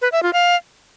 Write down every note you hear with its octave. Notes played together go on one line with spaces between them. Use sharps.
B4
E5
F4
F5